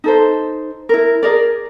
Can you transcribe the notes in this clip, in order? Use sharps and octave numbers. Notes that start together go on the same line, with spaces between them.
D#4 A4 C5
E4 A#4
G#4 A#4 D5